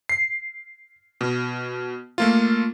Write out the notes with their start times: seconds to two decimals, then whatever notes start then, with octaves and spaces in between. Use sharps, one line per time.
0.09 C7
1.21 B2
2.18 A3 A#3 F4